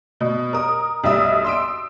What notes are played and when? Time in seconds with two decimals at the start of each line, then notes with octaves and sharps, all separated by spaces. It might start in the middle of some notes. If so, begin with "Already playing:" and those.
0.20 B2
0.53 A#4 D#6
1.04 B1 G3 E5 D#6
1.44 C6 E6 D7